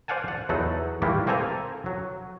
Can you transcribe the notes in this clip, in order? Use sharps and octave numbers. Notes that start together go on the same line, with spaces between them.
C5 D5 F5 F#5 G#5 A5
F#5
E2 F#3 D#4 A4 F#5
D#3 E3 G3 G#3 A#3 E4
A#3 C4 A4 G#5 A#5
F#3